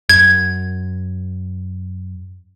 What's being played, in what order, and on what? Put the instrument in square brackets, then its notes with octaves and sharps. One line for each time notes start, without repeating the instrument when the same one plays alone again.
[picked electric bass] F#2 [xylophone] G#6